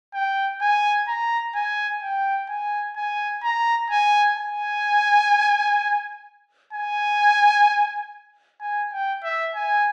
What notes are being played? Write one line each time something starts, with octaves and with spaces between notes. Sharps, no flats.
G5
G#5
A#5
G#5
G5
G#5
G#5
A#5
G#5
G#5
G#5
G#5
G5
E5
G#5